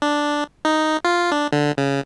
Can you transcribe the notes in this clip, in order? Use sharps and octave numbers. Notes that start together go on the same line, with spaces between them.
D4
D#4
F4
D4
D3
C#3